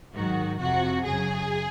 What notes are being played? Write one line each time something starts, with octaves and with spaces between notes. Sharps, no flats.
G#2 D#3 F#3 F#4
F2 C3 F3 F#4
F#2 C#3 F#3 G#4